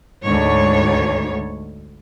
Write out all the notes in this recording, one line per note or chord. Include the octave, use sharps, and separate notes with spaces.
D2 G#2 C#5